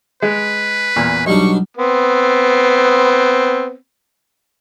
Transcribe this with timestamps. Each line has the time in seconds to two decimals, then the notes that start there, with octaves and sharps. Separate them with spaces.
0.22 G#3 B4
0.96 E2 A#2
1.26 B1 G3 D4 D#4 C#6
1.77 B3 C4